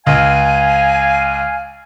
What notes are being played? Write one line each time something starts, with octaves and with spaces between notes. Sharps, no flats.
C#2 F5 G#5